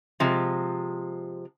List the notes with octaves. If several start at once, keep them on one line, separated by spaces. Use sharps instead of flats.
C3 F3 G#3